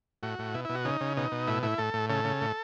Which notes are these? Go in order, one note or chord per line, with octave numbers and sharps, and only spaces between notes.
A2 F#4
A2
B2 E4
B2 E4
F#4
C#3 D#4
C#3
B2 D#4
B2
A2 E4
A2 E4
A2 A4
A2
C#3 A4
C#3
A2